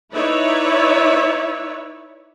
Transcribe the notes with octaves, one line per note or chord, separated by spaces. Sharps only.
D#4 E4 B4 C#5 D5 E5